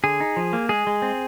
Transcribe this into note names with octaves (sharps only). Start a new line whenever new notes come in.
D3 G#4
D#4
F3
A#3
G#3 G#4
G#3
C4